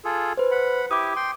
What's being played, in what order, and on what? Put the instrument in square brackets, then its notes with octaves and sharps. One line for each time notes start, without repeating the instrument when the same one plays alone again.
[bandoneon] F4 G#4 A4
[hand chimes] B4 C5
[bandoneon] F#5 B5
[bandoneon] E4 G4 [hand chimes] D6 D#6
[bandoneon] G5 C6